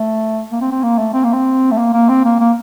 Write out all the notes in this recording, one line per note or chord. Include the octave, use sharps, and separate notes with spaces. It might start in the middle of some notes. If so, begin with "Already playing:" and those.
Already playing: A3
A#3
C4
C4
A#3
A3
C4
A#3
C4
A3
A#3
A#3
C4
A#3
A#3